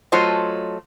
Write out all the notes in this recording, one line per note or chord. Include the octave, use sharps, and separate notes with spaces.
F#3 A3 F4 A4 C5 D#5